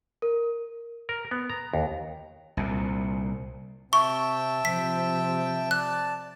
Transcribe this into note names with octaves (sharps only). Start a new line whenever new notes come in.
A#4
A#4
B3
A#5
D#2
C2 A#2
C3 E5 G5 A5 C#6
C3 F3 B6
D5 A5 F#6